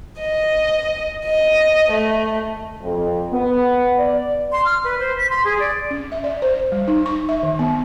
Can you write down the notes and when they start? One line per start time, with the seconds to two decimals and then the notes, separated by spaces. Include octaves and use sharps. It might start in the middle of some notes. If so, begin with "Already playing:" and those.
0.20 D#5
1.25 D#5
1.91 A3
2.81 F2
3.32 B3
3.99 D5
4.52 C6
4.65 F6
4.84 B4
5.00 C5
5.17 B6
5.30 C6
5.45 G#4
5.60 D5
5.91 C#4
6.12 E5
6.24 D5
6.42 C5
6.72 G3
6.88 D#4
7.06 C#6
7.29 E5
7.43 D#3
7.59 B3